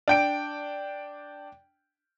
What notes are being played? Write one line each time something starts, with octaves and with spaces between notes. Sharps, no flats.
D4 G5 D7